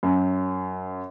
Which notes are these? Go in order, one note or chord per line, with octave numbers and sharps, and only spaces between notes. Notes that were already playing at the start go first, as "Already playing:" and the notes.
F#2